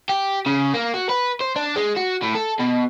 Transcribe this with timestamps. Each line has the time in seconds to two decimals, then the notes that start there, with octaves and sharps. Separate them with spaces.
0.09 G4
0.46 C#3
0.74 A#3
0.94 F#4
1.10 B4
1.41 C5
1.56 D4
1.76 G#3
1.96 F#4
2.22 A2
2.35 A4
2.59 B2